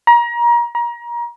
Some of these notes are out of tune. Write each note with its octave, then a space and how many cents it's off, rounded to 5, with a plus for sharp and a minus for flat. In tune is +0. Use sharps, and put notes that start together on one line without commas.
A#5 +30
A#5 +30